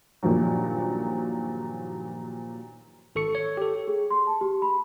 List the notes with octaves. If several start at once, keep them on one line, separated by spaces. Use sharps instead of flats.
G2 A#2 D#3 F3 F#3
G#1 A4 C#6 C#7
C#5
G4 A4
G#4
C6
A5
G4
B5